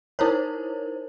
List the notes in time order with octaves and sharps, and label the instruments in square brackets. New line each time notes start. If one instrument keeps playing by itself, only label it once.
[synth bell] D#4 E4 A#4 C5 C#5